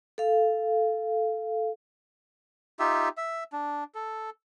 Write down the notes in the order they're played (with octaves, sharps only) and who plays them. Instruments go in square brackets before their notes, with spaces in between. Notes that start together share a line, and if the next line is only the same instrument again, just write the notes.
[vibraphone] A4 F5
[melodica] D#4 F4 G4 E5
E5
D4
A4